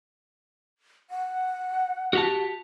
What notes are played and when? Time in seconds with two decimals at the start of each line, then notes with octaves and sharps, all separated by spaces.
1.10 F#5
2.13 F#4 G4 A5